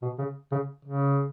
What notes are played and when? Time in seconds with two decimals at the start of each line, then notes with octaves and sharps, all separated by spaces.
0.02 B2
0.18 C#3
0.52 C#3
0.85 C#3